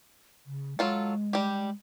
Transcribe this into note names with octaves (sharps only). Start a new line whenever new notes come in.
C#3
F#3 G#3 F4 A4
G3 G4